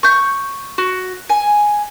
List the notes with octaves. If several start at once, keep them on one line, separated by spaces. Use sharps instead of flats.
C#6 G6
F#4
G#5